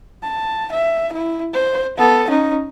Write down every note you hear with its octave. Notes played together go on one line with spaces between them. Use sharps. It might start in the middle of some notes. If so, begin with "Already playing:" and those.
A5
E5
E4
C5
B3 A4
C#4 D#4